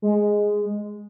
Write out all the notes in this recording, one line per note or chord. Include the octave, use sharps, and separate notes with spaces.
G#3